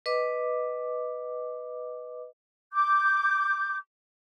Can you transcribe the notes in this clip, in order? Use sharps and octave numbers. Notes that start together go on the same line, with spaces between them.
B4 D#5 D6
D6 G6